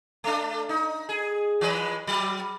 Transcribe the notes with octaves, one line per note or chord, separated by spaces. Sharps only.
A3 D4
D#4
G#4
E3 G#3 B4
F#3